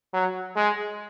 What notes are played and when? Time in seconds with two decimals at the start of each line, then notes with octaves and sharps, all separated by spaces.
0.13 F#3
0.56 G#3